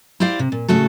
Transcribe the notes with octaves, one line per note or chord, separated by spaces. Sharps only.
E4 G4 C5 D5 F5
C3
A#2
A2 C#3 A3 F#4 A4